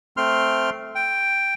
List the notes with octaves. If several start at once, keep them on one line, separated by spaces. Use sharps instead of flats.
A3 C4 C6 F6
G5